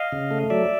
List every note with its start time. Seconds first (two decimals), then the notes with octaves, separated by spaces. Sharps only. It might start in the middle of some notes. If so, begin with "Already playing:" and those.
Already playing: D#5 F5
0.12 C#3
0.31 A3
0.50 F#3 D5 E5